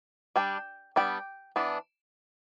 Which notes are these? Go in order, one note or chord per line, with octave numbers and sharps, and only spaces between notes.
G3 D4 G5
G3 B3 D4 G5
E3 B3 D4